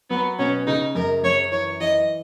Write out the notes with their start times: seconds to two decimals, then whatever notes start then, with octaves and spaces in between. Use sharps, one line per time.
0.10 F#3 B3
0.39 B2 C#4
0.67 C#3 D#4
0.95 F#2 A#4
1.23 F#2 C#5
1.52 E3 C#5
1.81 E3 D#5